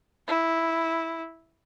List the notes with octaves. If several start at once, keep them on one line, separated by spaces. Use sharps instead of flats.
E4